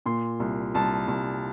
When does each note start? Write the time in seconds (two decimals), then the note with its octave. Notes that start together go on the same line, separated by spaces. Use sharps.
0.06 A#2 C6
0.40 C2
0.75 C2 A5
1.08 C2